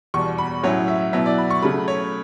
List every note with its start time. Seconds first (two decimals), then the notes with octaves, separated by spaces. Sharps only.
0.14 E2 B2 G3 C#6
0.38 B5
0.63 A2 F#3 C#4 E4 C#5
0.88 E5
1.13 B2 F#3 B3 E4 E5
1.26 D5
1.38 B5
1.51 C#6
1.62 C#3 F#3 A3 B5
1.88 C#5